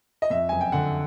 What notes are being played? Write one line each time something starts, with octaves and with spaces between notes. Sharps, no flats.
D#5
F2 E5
F#1 G#5
G5
D3 F#5